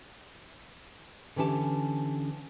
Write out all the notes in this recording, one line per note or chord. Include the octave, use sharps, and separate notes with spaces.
D3 E3 C#4 G4 A5